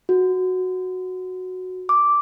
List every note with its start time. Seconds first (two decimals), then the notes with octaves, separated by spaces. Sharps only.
0.09 F#4
1.89 D6